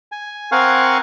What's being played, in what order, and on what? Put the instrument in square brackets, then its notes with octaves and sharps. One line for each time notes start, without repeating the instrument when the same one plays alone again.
[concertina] G#5
C4 A#4 F5 F#5 G#5 C#6